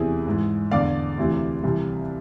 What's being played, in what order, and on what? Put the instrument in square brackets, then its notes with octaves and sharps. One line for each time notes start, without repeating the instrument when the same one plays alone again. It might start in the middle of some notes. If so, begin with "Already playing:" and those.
Already playing: [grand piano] E2 C3 E3 E4 G#4
G#2 E3
E2 D3 D5 F5
D2 C3 E3
C2 C3 E3